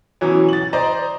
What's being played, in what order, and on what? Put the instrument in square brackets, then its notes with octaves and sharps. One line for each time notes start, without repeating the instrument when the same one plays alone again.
[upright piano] B2 E3 F#3 C#4
A6 F#7
C5 D5 D#5 A#5